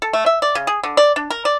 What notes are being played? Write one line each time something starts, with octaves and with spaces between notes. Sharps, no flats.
A4
A3
E5
D5
C#3
G#4
D3
D5
D4
A#4
D5